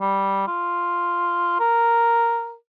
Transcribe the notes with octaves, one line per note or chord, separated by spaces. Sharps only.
G3
F4
A#4